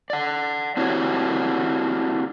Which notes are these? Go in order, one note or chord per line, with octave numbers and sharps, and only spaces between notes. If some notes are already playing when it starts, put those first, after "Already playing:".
D5 F#5
C4 D4 E4 F#4 G4 C#5